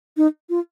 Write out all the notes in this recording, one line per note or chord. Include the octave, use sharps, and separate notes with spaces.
D#4
F4